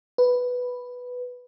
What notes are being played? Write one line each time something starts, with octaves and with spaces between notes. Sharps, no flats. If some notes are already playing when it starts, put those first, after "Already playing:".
B4